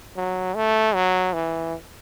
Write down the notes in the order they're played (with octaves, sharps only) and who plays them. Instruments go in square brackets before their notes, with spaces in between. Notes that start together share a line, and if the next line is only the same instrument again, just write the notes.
[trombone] F#3
A3
F#3
E3